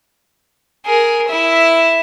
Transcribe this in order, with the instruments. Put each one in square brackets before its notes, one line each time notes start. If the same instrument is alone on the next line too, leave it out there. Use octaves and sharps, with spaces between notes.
[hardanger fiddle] G#4 A#4
E4 E5